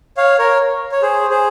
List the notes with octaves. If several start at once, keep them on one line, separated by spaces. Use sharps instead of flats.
C#5 F5
A#4 C#5
C#5
G#4 C5
G#4 C5